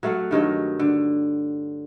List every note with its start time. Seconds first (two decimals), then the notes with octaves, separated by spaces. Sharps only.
0.03 F#3 A3 F5 F#5
0.31 G2 D#3 F#3 D#5
0.79 D3